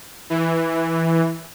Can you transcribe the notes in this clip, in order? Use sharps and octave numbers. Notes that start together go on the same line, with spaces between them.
E3